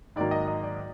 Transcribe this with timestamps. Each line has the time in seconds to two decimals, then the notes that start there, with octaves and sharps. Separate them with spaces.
0.16 G#2 D#3 F#3 A#3 D5
0.31 D#5
0.48 D#5
0.63 D5